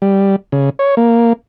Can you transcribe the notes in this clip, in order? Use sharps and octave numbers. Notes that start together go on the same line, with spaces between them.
G3
C#3
C#5
A#3